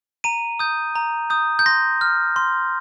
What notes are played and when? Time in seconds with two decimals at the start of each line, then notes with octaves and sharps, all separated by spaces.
0.24 A#5 D#7
0.59 D#6 G6
0.96 A#5
1.30 D#6 G6
1.59 G6
1.66 C6 A#6
2.01 F6
2.36 C6